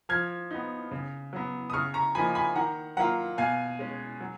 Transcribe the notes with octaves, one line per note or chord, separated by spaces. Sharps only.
F3 F6 G#6
B3 D#4
C#3
F#3 B3
D#6
C#3 C#6 F6
A#5 C#6
F3 A#3 D#4 G#5 B5
G#5 B5
D#3 F#5 A#5
F#3 A#3 F4 F#5 A#5
B2 F5 G#5
G#3 C#4
F#3